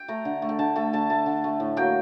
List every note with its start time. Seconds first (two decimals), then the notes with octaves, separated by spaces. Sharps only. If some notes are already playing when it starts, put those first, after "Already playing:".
Already playing: G5
0.08 A3 A#5
0.25 D3
0.42 A3
0.49 G5
0.59 D3 A5
0.76 A3 G5
0.93 D3 A5
1.10 A3 A5
1.26 D3
1.44 A3
1.60 A2
1.77 F#3 A#3 G5